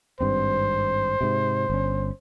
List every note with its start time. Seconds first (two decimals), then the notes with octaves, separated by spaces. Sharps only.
0.20 G#1 G2 C4 C5
1.21 G#2 C3
1.70 G1 C#4